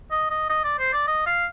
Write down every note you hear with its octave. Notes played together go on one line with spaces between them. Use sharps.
D#5
D#5
D#5
D5
C5
D5
D#5
F5